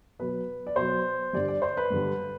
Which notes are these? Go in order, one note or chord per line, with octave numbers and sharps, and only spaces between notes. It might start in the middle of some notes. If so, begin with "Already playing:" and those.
B2 F#3 B4
D5
B2 F#3 C5
G2 D3 G3 D5
D5
C5
B4
G2 D3 G3